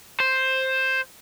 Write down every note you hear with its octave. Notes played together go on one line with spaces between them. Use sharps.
C5